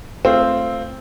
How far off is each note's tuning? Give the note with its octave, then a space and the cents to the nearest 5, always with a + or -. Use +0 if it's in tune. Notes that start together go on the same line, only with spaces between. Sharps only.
A3 +0 C4 +0 F4 -15